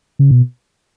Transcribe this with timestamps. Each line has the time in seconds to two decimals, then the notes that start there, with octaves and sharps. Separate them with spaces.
0.19 C#3
0.31 B2